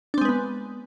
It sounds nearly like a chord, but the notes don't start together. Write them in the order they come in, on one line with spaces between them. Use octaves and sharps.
D4 C4 G#3 B4 B3